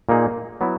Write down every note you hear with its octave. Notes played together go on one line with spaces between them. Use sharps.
A#2 A#3 D#4 G#4
F#3 B3 E4